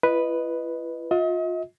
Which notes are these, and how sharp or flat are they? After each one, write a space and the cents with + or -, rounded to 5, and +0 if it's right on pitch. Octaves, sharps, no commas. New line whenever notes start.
E4 +45 B4 +0 D#5 -5
F4 +30 D#5 +40